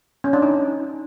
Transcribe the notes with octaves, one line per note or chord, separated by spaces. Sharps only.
C#4
D4
D#4